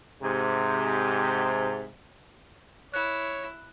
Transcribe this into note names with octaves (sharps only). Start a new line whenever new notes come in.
G#2 C3
E4 C#5 F#6